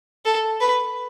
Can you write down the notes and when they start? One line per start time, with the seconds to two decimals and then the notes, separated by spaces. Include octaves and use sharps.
0.25 A4
0.60 B4